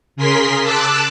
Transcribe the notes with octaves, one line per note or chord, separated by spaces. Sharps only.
C#3 G#4 A#4 C6 B6
A5 D6 E6 F#6